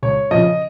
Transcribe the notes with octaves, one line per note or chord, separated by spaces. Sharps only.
C#2 C#5
C#3 F3 D#5